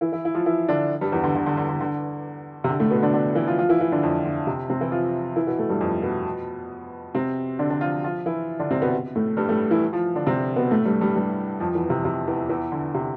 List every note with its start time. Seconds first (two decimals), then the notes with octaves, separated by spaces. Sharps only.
0.01 E3 E4
0.12 E3 E4
0.25 E4
0.34 F3 F4
0.46 E3 E4
0.68 D3 D4
1.01 G2 G3
1.12 E2 E3
1.24 D3
1.35 D3
1.46 D3
1.57 D3
1.69 D3
1.80 D3
2.64 C3
2.69 D3
2.80 A2 A3
2.91 B2 B3
3.02 D3 D4
3.13 D3 D4
3.35 E3 E4
3.47 F3 F4
3.58 F3 F4
3.69 E3 E4
3.80 E3 E4
3.92 D3 D4
4.03 F2 F3
4.25 D3
4.47 C3
4.69 C3 C4
4.80 E3 E4
4.92 F3 F4
5.36 E3 E4
5.47 B2 B3
5.59 A2 A3
5.69 G2 G3
5.81 F2 F3
6.03 B2 B3
7.15 C3 C4
7.59 D3 D4
7.70 D3 D4
7.81 F3 F4
8.04 F3 F4
8.26 E3 E4
8.59 D3 D4
8.71 C3 C4
8.82 B2 B3
9.16 A2 A3
9.37 G2 G3
9.49 A2 A3
9.71 E3 E4
9.93 F3 F4
10.15 D3 D4
10.27 C3 C4
10.56 B2 B3
10.71 A2 A3
10.85 G2 G3
11.01 G2 G3
11.16 G2 G3
11.60 F2 F3
11.75 E2 E3
11.90 C3
12.05 C3
12.28 E2 E3
12.49 E2 E3
12.72 D3
12.94 C3